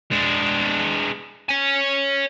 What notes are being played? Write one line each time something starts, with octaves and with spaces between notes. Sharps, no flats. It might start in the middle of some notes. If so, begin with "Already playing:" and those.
G#3 D4
C#5 G#5